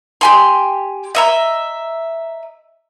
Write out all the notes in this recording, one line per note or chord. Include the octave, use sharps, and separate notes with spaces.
G4 G#5 C6
D#5 E5 A#5